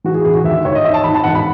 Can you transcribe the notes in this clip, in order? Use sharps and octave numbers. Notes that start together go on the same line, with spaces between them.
E3 F#4
G#4
E1 G#4
F#4
D#2 E5
D#2 C#5
D#5
G#1 E5
A5
G#1 B5
A5
E1 F#5
B5